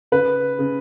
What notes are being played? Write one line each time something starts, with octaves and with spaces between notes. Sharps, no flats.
C#3 B4
C#3